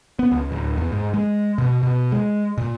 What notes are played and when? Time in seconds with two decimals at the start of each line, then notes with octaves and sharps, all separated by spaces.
0.19 B3
0.32 C#2
0.52 D1
0.78 E2
0.92 G#2
1.14 G#3
1.58 B2
1.83 B2
2.12 G#3
2.58 A#2